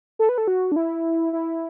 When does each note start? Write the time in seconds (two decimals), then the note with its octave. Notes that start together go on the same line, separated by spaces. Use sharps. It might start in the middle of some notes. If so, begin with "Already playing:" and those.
0.19 A4
0.29 B4
0.38 A4
0.48 F#4
0.72 D4
0.76 E4
1.33 E4